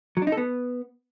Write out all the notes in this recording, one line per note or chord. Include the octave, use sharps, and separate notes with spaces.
F#3
D4
D#4
A4
B3